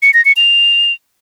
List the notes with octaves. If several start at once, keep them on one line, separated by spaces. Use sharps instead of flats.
C#7
A#6
C#7
F7